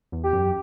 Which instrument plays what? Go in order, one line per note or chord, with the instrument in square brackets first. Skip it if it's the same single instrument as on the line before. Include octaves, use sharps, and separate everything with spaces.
[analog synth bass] E2
[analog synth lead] G4
[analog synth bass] F#2